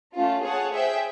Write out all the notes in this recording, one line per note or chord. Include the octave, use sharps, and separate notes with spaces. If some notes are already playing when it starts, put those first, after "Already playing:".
A3 C#4 F4
G#4 C#5 F#5 A5
G#4 C5 E5 G5